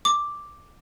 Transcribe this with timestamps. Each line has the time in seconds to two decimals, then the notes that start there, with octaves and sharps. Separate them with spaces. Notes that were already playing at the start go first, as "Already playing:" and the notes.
0.05 D6